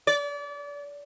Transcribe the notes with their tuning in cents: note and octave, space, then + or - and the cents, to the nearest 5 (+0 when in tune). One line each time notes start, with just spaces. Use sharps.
D5 -30